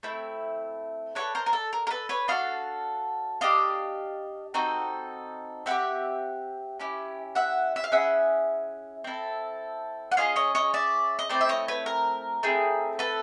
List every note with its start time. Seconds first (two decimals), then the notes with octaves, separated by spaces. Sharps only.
0.03 A3 C4 E4
1.15 D4 F#4 A4 B4 C#5
1.35 A#4 C5
1.46 A#4
1.53 A4
1.73 A#4
1.87 A#4
1.91 A4 B4
2.09 B4 C#5
2.28 D4 F#4 A4 D#5 F5
3.41 D4 G4 D#5 F5
4.54 C4 D#4 F#4 A4
5.66 C4 E4 G4 E5 F#5
6.80 C#4 E4 G4
7.35 E5 F#5
7.76 E5
7.84 F5
7.92 C#4 E4 G#4 E5 F#5
9.04 C4 E4 A4
10.12 F#5
10.17 C#4 F4 G#4 D#5 F5
10.36 C#5 D#5
10.55 C#5 D#5
10.74 D5 E5
11.19 D#5
11.29 A3 C4 E4 C5 D5
11.41 E5
11.49 C#5 D#5
11.68 B4 C#5
11.86 A#4
12.43 A3 C4 E4 G#4
12.99 A4 B4